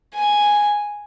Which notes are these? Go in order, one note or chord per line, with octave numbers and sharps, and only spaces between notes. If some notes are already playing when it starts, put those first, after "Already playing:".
G#5